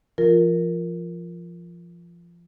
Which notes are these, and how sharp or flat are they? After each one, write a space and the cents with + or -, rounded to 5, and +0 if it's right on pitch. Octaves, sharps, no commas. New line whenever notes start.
F3 -30 F4 +0 A#4 +0